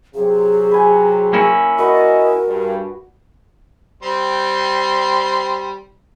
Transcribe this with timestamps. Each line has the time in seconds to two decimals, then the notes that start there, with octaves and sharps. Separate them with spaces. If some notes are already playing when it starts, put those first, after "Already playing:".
0.14 C3 F#3 G#4
0.71 B4 G#5
1.33 A#3 C#4 E4
1.78 F#4 A#4 B4 D5 D#5
2.45 G2
4.03 G3 C4 C6